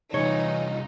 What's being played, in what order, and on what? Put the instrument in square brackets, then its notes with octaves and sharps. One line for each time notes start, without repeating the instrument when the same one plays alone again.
[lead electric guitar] C2 F4 [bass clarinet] E3 [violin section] D#4 [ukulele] C#5